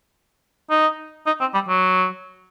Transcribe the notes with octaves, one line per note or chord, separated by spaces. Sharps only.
D#4
D#4
C4
G3
F#3